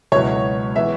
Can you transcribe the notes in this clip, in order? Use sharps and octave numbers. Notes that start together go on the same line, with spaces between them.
C#2 B2 F#3 B3 E4 C#5
E3 B3 E5